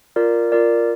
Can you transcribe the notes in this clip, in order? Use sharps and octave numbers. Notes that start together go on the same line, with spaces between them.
F4 A#4 D5
F4 A#4 D5